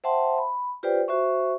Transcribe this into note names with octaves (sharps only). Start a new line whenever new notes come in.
C5 E5 F#5 G5 A5 C6
B5
F4 G4 B4 C5 D5 G5
F#4 C5 E5 C#6